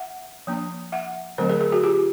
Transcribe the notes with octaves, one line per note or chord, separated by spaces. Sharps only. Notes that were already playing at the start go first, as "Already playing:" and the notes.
Already playing: E5 F#5
F3 A#3 D4
E5 F#5
D3 F#3 A3 C4 A#4 C5
G#4 A#4
G#4 A#4
F#4 G#4
F4 G4